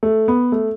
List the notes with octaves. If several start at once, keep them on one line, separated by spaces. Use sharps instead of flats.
A3
B3
A3